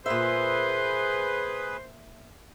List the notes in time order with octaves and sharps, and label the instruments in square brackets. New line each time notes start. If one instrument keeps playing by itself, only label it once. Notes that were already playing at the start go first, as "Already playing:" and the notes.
[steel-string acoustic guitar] A#2 E5 [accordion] G#4 B4 [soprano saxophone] C5